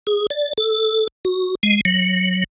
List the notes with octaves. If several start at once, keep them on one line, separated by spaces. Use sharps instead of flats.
G#4
D5
A4
F#4
G#3
F#3